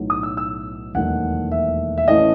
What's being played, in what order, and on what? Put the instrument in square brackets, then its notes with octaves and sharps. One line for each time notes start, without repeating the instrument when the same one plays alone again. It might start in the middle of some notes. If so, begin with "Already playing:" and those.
Already playing: [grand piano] B1 A2 F#3
D#6
E6
E6
E1 D#2 D#3 F#3 A3 F#5
E5
E5
A1 A2 E3 A3 C#4 D#5